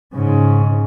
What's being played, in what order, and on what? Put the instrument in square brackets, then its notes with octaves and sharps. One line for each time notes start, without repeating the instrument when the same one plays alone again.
[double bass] G#2 C#3